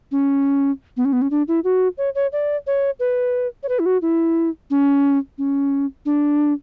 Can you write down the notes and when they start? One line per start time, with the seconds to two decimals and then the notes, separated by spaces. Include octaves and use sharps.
0.11 C#4
0.97 B3
1.05 C#4
1.13 B3
1.22 C#4
1.31 D4
1.48 E4
1.64 F#4
1.98 C#5
2.15 C#5
2.32 D5
2.67 C#5
2.99 B4
3.63 C#5
3.69 B4
3.79 E4
3.86 F#4
4.02 E4
4.70 C#4
5.38 C#4
6.05 D4